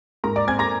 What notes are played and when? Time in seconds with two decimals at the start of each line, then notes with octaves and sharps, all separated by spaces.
0.24 G#2 A#4 A#5
0.36 D5 D6
0.47 C4 G#5 G#6
0.59 A#5 A#6